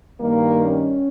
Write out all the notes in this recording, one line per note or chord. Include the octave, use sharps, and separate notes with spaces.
G2 D#3 G3 A#3
C#4